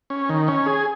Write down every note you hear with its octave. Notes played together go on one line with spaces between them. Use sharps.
C#4
D#3
C#4
G#4